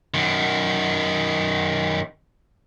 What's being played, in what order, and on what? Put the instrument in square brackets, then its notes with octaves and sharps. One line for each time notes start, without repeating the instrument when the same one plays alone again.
[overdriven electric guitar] F#2 D#3